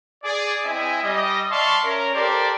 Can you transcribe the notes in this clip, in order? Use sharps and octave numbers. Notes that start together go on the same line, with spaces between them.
G#4 D5
C4 E4 D#5 E5 G#5
G3 D#5
D5 E5 F5 A5 C6 C#6
C#4 A#4
G4 A4 A#4 C5 D5